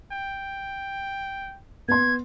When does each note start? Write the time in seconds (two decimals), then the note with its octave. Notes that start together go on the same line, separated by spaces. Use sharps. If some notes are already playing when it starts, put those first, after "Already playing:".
0.12 G5
1.88 B3 C6 G#6